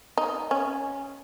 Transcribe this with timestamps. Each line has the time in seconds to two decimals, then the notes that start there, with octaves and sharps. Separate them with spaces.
0.17 D#4
0.51 C#4